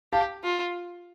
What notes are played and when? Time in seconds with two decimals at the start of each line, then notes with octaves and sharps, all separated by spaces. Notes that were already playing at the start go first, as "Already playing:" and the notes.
0.12 G4 F5 A5
0.43 F4